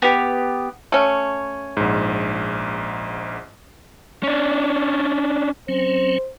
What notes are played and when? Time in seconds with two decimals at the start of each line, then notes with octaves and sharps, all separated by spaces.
0.02 B3 G4
0.92 A3 C#4
1.77 A#1 G#2
4.23 C#4 D4
5.68 F#3 C4 C#4 C5